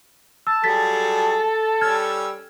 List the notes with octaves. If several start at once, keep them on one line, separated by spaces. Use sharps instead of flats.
A5 E6
F#3 G3 G#4 A4 A6 B6
G3 C#4 E6 F6 G#6